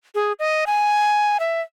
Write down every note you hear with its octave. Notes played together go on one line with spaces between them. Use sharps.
G#4
D#5
G#5
E5